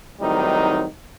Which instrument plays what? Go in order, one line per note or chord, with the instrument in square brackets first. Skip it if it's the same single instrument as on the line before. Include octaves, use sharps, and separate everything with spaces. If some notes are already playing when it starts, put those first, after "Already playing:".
[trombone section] A2 D#3 F#3 G3 C4 D#4